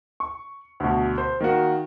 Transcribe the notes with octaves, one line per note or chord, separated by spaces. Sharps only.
C#6
D2 B2
C5
D#3 A#3 D#4 F#4